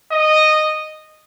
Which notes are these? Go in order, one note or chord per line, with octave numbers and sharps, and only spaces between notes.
D#5